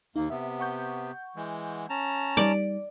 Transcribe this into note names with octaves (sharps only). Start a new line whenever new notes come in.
D#2 A#3 D#4
C3 B3 E5
F#5 C#6 G6
E3 G#3
C#4 A5 A#5
G3 D#4 D5